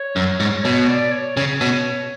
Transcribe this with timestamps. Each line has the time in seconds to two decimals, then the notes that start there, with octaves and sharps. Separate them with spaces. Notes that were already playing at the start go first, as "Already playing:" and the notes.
Already playing: C#5
0.16 F#2
0.40 G#2
0.64 B2 C#5
0.89 D5
1.12 C#5
1.37 C#3 C#5
1.61 B2